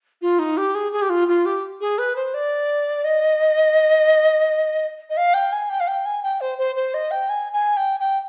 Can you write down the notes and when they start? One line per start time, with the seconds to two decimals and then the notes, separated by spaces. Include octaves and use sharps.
0.22 F4
0.39 D#4
0.57 G4
0.75 G#4
0.92 G#4
1.02 G4
1.10 F4
1.28 F4
1.46 G4
1.81 G#4
1.98 B4
2.16 C5
2.34 D5
3.04 D#5
5.10 D#5
5.17 F5
5.34 G5
5.52 G#5
5.70 G5
5.80 F5
5.88 G5
6.05 G#5
6.23 G5
6.41 C5
6.58 C5
6.76 C5
6.94 D#5
7.11 G5
7.29 G#5
7.53 G#5
7.77 G5
8.00 G5